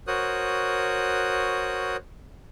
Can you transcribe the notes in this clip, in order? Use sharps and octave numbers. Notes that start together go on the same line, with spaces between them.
F#4 A#4 C5 C#5 D#6 F#6